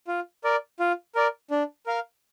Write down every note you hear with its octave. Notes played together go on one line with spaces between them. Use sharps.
F4
A#4 D5
F4
A#4 D5
D4
A#4 F5